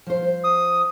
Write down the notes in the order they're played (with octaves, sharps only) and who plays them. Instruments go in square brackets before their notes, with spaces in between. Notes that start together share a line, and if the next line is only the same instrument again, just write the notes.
[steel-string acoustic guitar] F3 C5
[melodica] D#6